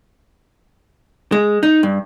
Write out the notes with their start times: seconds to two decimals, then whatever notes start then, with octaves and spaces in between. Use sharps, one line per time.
1.32 G#3
1.63 D#4
1.83 G2